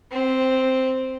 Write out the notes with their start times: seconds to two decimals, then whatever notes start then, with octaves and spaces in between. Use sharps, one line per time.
0.11 C4